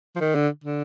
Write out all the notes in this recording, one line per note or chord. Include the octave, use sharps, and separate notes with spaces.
F3
D#3
D3
D3